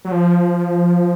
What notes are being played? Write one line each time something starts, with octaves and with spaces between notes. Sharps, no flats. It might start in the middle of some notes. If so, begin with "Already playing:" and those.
F#3
F3